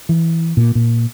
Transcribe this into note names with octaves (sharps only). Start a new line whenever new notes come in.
E3
A#2
A#2